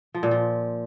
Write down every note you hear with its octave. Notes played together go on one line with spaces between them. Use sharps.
F3
A#2
F3